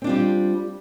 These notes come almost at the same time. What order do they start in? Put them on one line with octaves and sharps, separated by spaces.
C4 D4 F4 G3